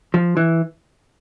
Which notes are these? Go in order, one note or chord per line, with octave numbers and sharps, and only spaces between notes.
F3
E3